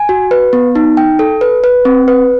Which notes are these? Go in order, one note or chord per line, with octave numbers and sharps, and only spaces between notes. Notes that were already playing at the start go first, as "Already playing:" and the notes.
Already playing: G#5
F#4
B4
B3
D#4
G5
A4
B4
B4
C4
B4